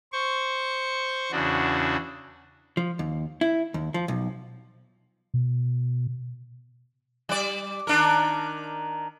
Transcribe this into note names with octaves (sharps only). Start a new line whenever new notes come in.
C5 C#6
E2 C#3 D4 F#4
F3
D#2
E4
D#2
F3
B1
B2
G3 D5
D#3 D4 A#4